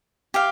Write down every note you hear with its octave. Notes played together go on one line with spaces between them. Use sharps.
G4 F5